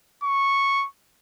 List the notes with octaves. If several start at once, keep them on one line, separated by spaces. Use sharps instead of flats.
C#6